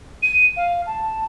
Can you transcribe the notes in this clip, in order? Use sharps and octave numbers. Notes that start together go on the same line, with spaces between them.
D#7
F5
A5